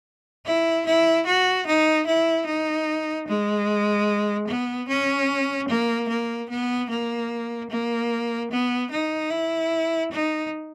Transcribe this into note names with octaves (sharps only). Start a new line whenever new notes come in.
E4
E4
F#4
D#4
E4
D#4
G#3
B3
C#4
A#3
A#3
B3
A#3
A#3
B3
D#4
E4
D#4